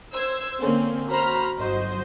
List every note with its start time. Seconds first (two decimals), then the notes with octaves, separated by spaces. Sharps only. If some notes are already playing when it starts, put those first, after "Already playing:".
0.13 C5 E6 G#6
0.61 D3 A#3 C4 C#4
1.09 F#4 C5 A#5 B5 F6
1.57 G1 F#3 F#4 C5 D#5 G6